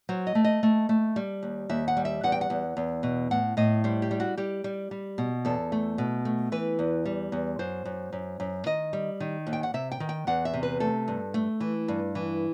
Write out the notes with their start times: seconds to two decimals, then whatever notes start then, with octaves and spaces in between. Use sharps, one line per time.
0.09 F#3 C5
0.27 D#5
0.35 A3
0.44 D#5
0.63 A3
0.89 A3
1.16 G3
1.43 D#2
1.69 D#2 E5
1.88 F#5
1.97 G3
2.05 E5
2.23 E2 F#5
2.32 G5
2.41 F#5
2.50 E2
2.77 E2
3.03 B2
3.31 A2 F#5
3.57 A2 D#5
3.84 G3 C5
4.02 G4
4.11 G3
4.20 F#4
4.37 G3 G4
4.64 G3
4.91 G3
5.18 B2
5.45 E2 A4
5.72 A3
5.98 B2
6.25 A3
6.52 E3 B4
6.79 E2
7.05 G3
7.32 E2
7.59 F#2 C5
7.85 F#2
8.12 F#2
8.40 F#2
8.66 D#3 D#5
8.93 G3
9.20 D#3
9.47 D#2
9.53 G5
9.63 F#5
9.74 C3 E5
9.92 G5
10.00 D#3
10.09 G5
10.27 E2 F#5
10.45 E5
10.54 C3
10.63 B4
10.80 A3 A4
11.08 G2
11.34 A3
11.60 E3
11.88 G2
12.15 E3